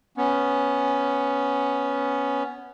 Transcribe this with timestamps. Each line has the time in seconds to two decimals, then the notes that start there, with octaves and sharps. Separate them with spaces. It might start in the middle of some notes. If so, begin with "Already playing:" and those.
0.17 B3 C#4